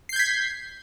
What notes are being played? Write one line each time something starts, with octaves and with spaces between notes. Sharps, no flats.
G6 G#6 B6 C7